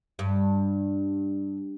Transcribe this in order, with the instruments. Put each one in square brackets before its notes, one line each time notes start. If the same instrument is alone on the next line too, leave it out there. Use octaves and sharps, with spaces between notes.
[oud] G2